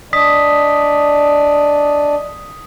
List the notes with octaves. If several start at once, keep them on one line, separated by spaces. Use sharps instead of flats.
D4 D5 D#5 D#6 B6